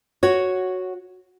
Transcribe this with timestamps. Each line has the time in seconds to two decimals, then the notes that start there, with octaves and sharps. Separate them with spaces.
0.23 F#4 C#5